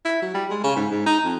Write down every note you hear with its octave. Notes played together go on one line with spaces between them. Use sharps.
E4
F#3
G3
G#3
C#3
G#2
G#2
D#4
F2